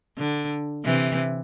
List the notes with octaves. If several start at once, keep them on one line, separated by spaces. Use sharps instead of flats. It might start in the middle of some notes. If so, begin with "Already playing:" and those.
D3
C3 E3